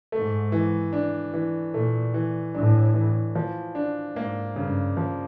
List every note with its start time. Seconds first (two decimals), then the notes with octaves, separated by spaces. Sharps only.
0.12 G#2 A3
0.52 E3
0.93 D4
1.34 E3
1.74 A#2 A3
2.14 E3
2.54 A2 D4
2.94 E3
3.35 F3
3.75 D4
4.15 G#2 A#3
4.55 G2 C#3
4.97 F3